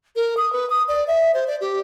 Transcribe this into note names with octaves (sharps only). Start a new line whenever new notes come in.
A#4
D#6
B4
D#6
D5
E5
C5
D5
G4